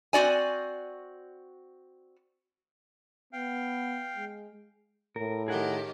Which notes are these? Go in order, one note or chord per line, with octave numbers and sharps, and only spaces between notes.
C4 F#4 D5 G#5
B3 F5 G5
G#3
A2 A#4
D#3 G4 G#4 A#4 F#5